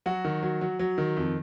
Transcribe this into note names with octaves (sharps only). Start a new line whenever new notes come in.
F#3 F#4
D#3
F#3
F#3
F#3
D#3
F2